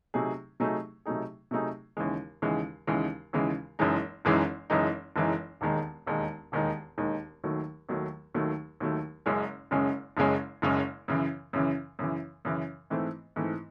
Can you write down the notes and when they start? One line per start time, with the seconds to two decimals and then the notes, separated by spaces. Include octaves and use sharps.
0.14 C3 F#3 A3 D#4 G#4
0.60 C3 F#3 A3 D#4 G#4
1.05 C3 F#3 A3 D#4 G#4
1.51 C3 F#3 A3 D#4 G#4
1.97 D#2 C#3 E3 G#3
2.42 D#2 C#3 E3 G#3
2.87 D#2 C#3 E3 G#3
3.33 D#2 C#3 E3 G#3
3.79 F#1 F#2 E3 G#3 D#4
4.25 F#1 F#2 E3 G#3 D#4
4.70 F#1 F#2 E3 G#3 D#4
5.16 F#1 F#2 E3 G#3 D#4
5.61 E1 D#2 D#3 G#3 D#4
6.06 E1 D#2 D#3 G#3 D#4
6.52 E1 D#2 D#3 G#3 D#4
6.97 E1 D#2 D#3 G#3 D#4
7.44 D#2 D#3 F#3 A3
7.89 D#2 D#3 F#3 A3
8.35 D#2 D#3 F#3 A3
8.80 D#2 D#3 F#3 A3
9.26 F#1 F#2 C#3 G#3 C#4
9.71 F#1 F#2 C#3 G#3 C#4
10.17 F#1 F#2 C#3 G#3 C#4
10.62 F#1 F#2 C#3 G#3 C#4
11.08 F#2 C#3 E3
11.53 F#2 C#3 E3
11.99 F#2 C#3 E3
12.45 F#2 C#3 E3
12.90 G#2 E3 A3 C4
13.36 G#2 E3 A3 C4